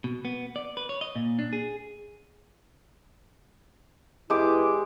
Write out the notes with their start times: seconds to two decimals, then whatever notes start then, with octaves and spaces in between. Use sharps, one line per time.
0.04 B2
0.25 B3
0.56 D5
0.77 B4
0.89 C#5
1.01 D#5
1.16 A#2
1.39 D4
1.53 G#4
4.30 E2 G#3 E4 G4 D6